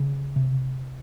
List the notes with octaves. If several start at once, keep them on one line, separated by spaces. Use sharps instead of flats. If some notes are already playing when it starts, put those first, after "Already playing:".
Already playing: C#3
C3